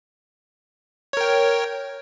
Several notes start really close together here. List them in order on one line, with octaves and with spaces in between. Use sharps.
C#5 A#4 G5